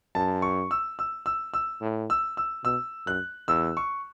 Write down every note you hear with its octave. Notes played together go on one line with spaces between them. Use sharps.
F#2 A5
C#6
E6
E6
E6
E6
A2
E6
E6
B2 E6
F#2 F#6
E2 E6
C#6